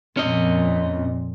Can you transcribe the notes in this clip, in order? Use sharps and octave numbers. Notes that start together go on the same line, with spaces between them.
F2 A#2 C#4 D#5